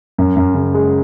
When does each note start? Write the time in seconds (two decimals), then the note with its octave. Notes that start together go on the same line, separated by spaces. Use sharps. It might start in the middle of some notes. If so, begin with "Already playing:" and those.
0.18 F#2
0.37 F#2
0.55 C#3
0.74 G#3